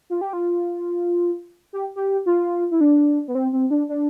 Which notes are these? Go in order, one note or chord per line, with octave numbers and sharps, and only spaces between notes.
F4
G4
F4
G4
G4
F4
E4
D4
B3
C4
C4
D4
D4